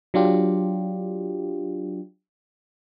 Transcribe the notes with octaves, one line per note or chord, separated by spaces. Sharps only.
F#3 D4 F4 G4